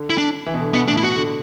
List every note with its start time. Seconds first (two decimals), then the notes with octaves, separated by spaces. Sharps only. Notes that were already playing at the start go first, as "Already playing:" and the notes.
Already playing: D3
0.10 E4
0.18 D4
0.46 E3
0.54 B2
0.61 D3
0.74 B2 B3
0.88 A2 D4
0.97 E4
1.03 B2 F#4
1.16 D3